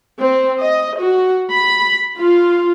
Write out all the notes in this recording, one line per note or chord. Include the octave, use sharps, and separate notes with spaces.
C4
D#5
F#4
B5
F4